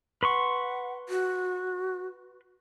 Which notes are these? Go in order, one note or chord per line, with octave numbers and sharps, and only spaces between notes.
B4 F#5 C6 C#6
F#4